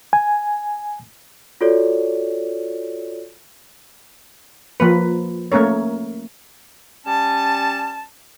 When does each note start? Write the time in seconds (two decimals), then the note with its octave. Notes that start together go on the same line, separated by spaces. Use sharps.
0.13 G#5
1.61 F4 F#4 A4 C#5 D5
4.80 F3 A#3 B4
5.52 A3 A#3 C#4 A#4 C#5
7.06 G3 C#4 A5